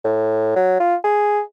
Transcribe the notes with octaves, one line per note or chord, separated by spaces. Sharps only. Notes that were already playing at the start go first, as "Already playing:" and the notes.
A2
F#3
F4
G#4